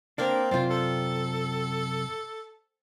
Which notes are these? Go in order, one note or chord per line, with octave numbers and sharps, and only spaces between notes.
A#3 C4 D4 A#4 D5
F#2 C3 F4 C5 D5
A4